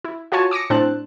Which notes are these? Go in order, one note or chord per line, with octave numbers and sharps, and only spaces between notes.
E4
F4 F#4 C#5 G#5 A5
D6 D#6 A#6 C#7
A2 C4 D4 A5 F#6